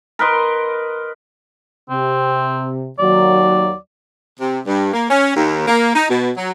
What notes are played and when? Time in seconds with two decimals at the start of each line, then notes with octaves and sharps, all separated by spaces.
0.19 A#4 B4 D#5 C6
1.90 C3 C4
2.99 D#2 F#3 D5
4.40 C3
4.66 G2
4.94 A#3
5.09 C#4
5.35 D#2
5.67 A#3
5.95 D#4
6.10 B2
6.36 F#3